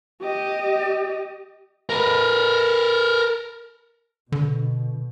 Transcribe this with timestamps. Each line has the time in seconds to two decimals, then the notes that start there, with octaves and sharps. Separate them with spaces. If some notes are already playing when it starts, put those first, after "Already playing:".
0.21 G4 D#5
1.90 A#4 B4
4.32 B2 D3